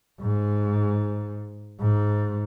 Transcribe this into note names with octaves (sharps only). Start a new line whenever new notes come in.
G#2
G#2